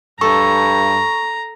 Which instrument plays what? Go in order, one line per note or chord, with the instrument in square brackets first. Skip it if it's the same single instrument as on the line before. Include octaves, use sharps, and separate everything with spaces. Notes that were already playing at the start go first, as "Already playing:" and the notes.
[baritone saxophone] G2 [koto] A4 [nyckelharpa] A#5 [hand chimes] C#6